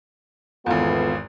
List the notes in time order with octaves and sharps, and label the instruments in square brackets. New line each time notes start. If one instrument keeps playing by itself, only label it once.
[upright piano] G#1 E2 [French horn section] C#3 A3 B3 [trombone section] F4